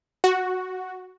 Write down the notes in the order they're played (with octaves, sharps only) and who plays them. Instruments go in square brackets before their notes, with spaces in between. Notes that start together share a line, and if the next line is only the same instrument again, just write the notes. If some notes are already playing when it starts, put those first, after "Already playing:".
[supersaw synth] F#4